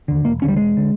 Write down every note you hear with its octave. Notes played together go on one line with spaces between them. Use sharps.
D#2 D3
E1 A#3
D#2 D3 C#4
G3
E1 G#3
D3